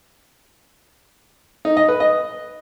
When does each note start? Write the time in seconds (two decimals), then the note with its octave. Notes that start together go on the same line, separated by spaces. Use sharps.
1.65 D#4
1.77 D#5
1.88 B4
2.00 D#5